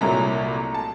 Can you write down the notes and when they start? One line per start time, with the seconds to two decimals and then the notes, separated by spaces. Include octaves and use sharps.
0.01 C2 A#2 F#3 A3 A#5
0.74 A5